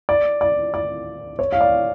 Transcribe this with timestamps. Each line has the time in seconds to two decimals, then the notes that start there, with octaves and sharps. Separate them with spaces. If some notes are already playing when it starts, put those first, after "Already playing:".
0.09 D5
0.41 D5
0.74 D5
1.39 C#5
1.53 F5
1.61 D5